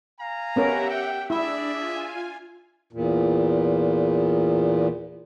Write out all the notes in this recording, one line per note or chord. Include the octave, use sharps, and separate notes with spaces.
F5 G#5 A#5
B3 C#4 G4 A#4 E5 F#5
G5
D4 E4 G#4 D5 E5
F4 G#5
E2 A#2